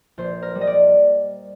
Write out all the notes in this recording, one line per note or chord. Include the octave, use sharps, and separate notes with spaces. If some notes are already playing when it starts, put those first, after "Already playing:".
A#1 C5
A#4
G3
D#5
D5